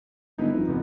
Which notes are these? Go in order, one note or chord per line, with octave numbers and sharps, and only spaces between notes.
G1 D#4 E4 B4
F2
C#2 B3